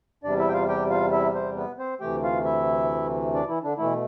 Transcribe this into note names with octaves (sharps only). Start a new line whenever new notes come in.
E2 C3 G3 D4 D5
E4 E5
G5
F4 F5
G4 G5
F4 F5
E4 E5
C4 C5
B3 B4
C4 C5
D2 C3 E3 A3 G4 G5
F4 F5
E4 E5
D4 D5
E3 E4
D3 D4
B2 E3 A3 E4